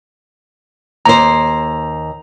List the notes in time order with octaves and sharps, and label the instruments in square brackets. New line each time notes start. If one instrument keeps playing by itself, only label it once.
[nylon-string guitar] D#2 C5 [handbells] A#5